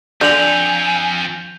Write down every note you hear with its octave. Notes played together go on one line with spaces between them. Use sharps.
F2 D3 G#5 G6 F7 F#7